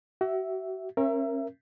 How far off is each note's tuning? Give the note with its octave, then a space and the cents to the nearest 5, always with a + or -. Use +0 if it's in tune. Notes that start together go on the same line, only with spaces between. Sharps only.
F#4 +35 E5 +0
C#4 -35 A#4 +0 E5 +25